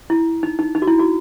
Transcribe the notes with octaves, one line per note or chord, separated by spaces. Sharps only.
E4
D#4
D#4
D#4
F#4
E4
F#4